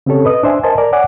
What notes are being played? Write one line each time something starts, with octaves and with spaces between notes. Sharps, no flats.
C#3 C4 C#4 G4 A4 C#5
B4 D#5 D#6
D4 C5 E5 G#5
A#4 C5 D#5 G#5 A5
A#4 D5
C#5 D5 F#5 G#5 D6